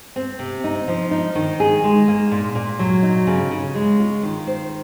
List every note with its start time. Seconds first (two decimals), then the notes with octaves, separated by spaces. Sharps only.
0.16 C4
0.39 C3
0.64 D#4
0.88 F3
1.11 D#4
1.35 D#3
1.60 G#4
1.84 G#3
2.08 A#3
2.31 A#2
2.55 A#2
2.79 F#3
3.03 D#4
3.27 C#3
3.51 C#3
3.75 G#3
4.00 F4
4.23 D#3
4.47 C5